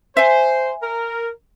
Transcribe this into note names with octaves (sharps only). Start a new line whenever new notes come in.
C5 E5 G#5
A#4